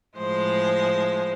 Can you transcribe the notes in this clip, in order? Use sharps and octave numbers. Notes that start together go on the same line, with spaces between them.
A2 F3 G#3 C5